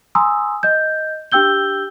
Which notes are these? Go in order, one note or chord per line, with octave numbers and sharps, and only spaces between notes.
G#5 A#5 C6 D#6 E6
D#5 G6
D4 G4 G5 E6 G6 G7